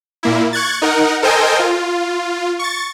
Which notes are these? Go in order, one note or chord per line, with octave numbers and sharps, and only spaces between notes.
A#2 A#3 E4
C#6 F#6 G#6 A6
D#4 A#4 F#5
A4 A#4 C5 D#5 G5 G#5
F4
C#6 A6